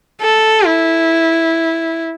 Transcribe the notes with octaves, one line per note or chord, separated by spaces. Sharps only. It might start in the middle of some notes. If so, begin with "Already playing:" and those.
A4
E4